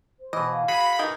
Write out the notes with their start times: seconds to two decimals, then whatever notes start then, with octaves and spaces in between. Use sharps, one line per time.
0.19 C5
0.33 B2 E3 D#5
0.51 F5
0.68 F#4 G#4 B5
0.99 E3 D#4 A#4